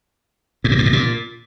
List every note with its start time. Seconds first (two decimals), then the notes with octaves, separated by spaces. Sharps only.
0.64 G#2
0.71 A#2
0.79 G2
0.86 A2
0.93 A#2